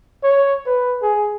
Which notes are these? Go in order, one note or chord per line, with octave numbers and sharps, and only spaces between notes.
C#5
B4
G#4